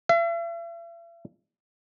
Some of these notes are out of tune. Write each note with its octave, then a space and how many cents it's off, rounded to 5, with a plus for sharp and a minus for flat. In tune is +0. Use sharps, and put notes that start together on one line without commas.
E5 +45